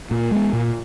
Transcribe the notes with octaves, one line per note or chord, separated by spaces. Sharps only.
A#2
G#3 B3
A#2